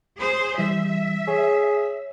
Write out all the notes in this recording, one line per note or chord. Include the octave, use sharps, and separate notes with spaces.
G#4 C5
E3 G3 E5
G#4 C#5